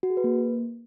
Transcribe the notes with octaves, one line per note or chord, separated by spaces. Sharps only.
F#4
G#4
B4
A#3